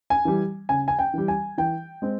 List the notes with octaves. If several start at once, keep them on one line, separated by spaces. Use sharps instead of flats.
G#5
E3 G3
C#3 G#5
G#5
G5
E3 G3
G#5
E3 G5
G#3 C4